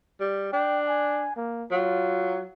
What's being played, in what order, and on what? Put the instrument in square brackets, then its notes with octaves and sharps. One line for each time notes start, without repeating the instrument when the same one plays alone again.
[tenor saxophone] G3
[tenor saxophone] D4 [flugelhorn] G5
[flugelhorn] G#5
A#3
[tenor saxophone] F#3 [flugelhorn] F4